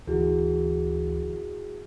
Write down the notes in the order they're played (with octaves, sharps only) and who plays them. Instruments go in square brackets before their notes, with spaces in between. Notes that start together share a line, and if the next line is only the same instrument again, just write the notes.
[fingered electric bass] D2 E3 [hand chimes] E4 F#4 G#4